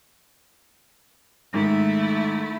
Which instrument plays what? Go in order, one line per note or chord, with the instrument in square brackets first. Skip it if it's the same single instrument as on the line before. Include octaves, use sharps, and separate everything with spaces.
[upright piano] G#2 D#3 [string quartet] A3 E4